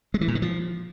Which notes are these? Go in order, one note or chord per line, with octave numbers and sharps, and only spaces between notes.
G#3
E3
A#2
D#3
F3